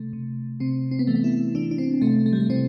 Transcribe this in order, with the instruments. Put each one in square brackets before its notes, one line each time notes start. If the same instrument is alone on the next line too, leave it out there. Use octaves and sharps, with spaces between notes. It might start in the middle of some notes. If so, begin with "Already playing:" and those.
Already playing: [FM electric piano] C3 A3
C3
C3 C4
C4
B3
E3 A3
B3
E4
E3 D4
D4
C4
C3 A3
A3
G3
A3
C3 C4